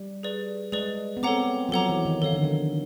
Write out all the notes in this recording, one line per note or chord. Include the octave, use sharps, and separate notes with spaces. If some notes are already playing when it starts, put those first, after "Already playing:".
Already playing: G3
G#4 B4 D5
G#3 G#4 B4 D5
B3
C4 A4 C#5 F#5 A#5 D6
F3
F#3 A4 C#5 F#5 A#5 D6
E3
D#3
D#3 A4 C#5 F5
D3
D#3